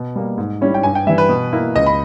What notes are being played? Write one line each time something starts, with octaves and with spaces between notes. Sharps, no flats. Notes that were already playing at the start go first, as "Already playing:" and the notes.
Already playing: B2
G3 A#3
G#2
G3 C#4 E4
G5
G2 G#5
G5
E3 G3 E5
B4
B2
A#3 E4
C#2 D#5
B5